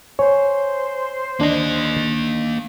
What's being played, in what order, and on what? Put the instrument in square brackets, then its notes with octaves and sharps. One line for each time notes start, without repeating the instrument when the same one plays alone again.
[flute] C5 [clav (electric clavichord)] C#5 [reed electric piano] G#5
[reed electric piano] D2 D#3 D4 [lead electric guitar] A#3 D#5